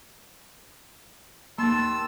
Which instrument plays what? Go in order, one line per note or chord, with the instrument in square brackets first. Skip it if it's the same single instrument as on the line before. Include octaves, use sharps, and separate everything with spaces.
[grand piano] D#2 C6 [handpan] A#3 [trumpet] A5 [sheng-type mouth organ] E6